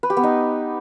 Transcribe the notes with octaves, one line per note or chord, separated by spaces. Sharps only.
B4
G4
B3
D#4